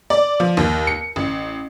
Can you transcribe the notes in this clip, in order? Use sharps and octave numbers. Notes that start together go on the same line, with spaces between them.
D5
F3
D#2
C#7
A1